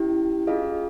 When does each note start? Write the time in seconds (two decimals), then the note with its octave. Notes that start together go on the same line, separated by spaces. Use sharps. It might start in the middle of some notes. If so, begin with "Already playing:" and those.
Already playing: C#4 E4 G4
0.47 C#4 F4 G#4 D#5 F5